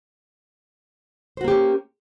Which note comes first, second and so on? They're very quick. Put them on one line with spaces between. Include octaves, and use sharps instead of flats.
C5 F#4 A#3 G4 C#4